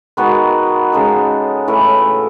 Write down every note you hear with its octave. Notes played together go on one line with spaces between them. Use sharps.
D#3 G#3 B3 F#4
C#3 G#3 D#4 A4
A2 E3 A3 E4